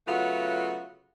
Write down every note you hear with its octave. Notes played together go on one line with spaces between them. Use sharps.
C#3 F#3 A3 B3 F4 F#4